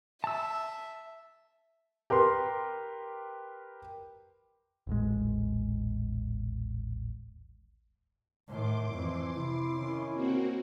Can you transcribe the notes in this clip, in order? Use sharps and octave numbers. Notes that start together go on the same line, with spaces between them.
E5 A5 E6
G4 A#4 B4 C6
D#1 A1 G#3
A2 D#3 C6 D6
F2 E3
C3 E4
D#3 C#4
A#3 C4 F#4